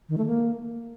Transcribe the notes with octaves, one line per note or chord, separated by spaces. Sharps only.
D#3
A3
A#3